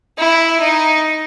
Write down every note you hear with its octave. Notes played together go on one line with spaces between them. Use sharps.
E4
D#4